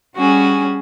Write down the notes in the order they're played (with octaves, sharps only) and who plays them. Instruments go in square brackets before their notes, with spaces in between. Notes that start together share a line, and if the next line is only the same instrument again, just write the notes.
[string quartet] G3 C#4 F#4 G#4